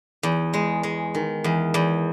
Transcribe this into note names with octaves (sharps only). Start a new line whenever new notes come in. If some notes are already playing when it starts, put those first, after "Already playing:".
E2
G#3
G#3
D#3
E2
E2